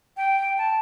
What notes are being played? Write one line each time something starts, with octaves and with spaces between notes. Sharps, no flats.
G5
A5